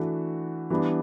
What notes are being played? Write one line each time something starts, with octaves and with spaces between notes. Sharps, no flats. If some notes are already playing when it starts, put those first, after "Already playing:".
Already playing: E3 A3 D4 F#4
E3 G3 B3 D4